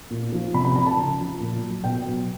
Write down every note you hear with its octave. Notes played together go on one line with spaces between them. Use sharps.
A#2
F3
C3 B5
B5
F3 A#5
A5
C#3
F3
A#2
F#3
B2 G5
F#3